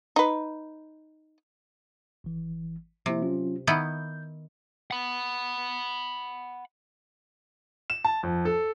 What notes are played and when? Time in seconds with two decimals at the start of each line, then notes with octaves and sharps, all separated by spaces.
0.16 D#4 B4
2.24 G#1 E3
3.06 C3 F3 A#3 E4
3.22 F#3 C#4 F4
3.67 D#3 B3 E4 G6
4.91 F#5 B5
7.90 E7
8.04 A5
8.23 F2
8.45 A4